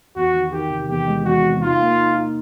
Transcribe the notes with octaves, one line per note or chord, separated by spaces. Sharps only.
E2 F#4
D#3
D#3 G4
C3
E2 G4
G#3
E2 F#4
C3
D#4 F4
A#3
D#4
A#3